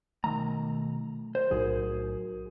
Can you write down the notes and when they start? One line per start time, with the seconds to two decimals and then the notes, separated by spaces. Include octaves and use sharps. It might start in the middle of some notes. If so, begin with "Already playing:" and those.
0.24 B1 D#3 A3 A#5
1.35 C5
1.51 B1 A2 F#3 D#4 F#4 G#4 A#4